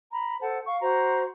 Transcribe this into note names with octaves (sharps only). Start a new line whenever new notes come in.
A#5 B5
A4 C5 F#5 A5
F5 C#6
F#4 C5 A#5